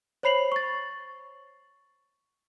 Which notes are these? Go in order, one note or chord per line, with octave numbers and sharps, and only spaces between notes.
C5 C#5 B5 C7 F7 F#7
C#6 A6